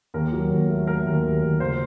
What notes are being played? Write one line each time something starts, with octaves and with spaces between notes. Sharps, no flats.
D#2 A#4
F#3
D#2
A3
A3 A#4
D#2
D#2
D#2
C#2 C5